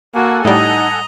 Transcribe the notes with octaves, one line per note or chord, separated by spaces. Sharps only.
A#3 F#4 A4 F#5 G#5
A2 G3 D#4 D#5 A#5